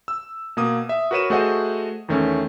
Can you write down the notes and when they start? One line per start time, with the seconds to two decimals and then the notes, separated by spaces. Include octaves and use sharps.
0.08 E6
0.57 B2 A#3 D#6
0.89 E5
1.11 F#4 A#4 B4 C#5 D#7 E7
1.30 A3 F#4 G#4 C5 D#5 F#5
2.08 E2 D#3 A3 C#4